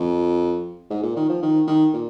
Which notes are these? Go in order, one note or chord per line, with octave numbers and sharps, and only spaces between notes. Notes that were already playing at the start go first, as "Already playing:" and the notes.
Already playing: F2
G#2
A#2
D#3
F3
D#3
D#3
A#2